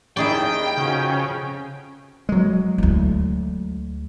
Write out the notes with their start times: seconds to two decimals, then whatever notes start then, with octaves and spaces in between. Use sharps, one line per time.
0.17 D#2 D#3 D#4 E4 G#4 D5 G5
0.77 F2 C#3 C#4 F#4
2.29 F#3 G#3
2.78 D2 E4